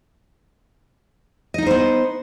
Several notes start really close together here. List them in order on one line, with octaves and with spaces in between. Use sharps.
D#5 D#4 A#4 C5 B3